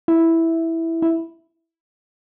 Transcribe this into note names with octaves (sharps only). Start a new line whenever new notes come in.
E4
E4